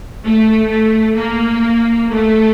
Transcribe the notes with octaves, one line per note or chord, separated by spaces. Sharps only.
A3
A3
A#3
A3